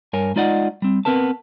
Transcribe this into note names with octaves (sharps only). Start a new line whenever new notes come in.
G2 A#4 C#5 G#5
G#3 D#4 F4 D5 D#5 F#5
G3 C4
B3 C4 A#4 B4 A5